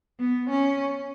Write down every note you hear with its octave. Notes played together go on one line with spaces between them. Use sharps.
B3
C#4